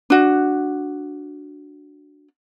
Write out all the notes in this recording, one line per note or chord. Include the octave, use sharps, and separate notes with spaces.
D4 F#4